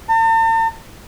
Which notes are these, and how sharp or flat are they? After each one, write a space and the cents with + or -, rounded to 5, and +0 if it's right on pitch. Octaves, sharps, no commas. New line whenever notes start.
A5 +45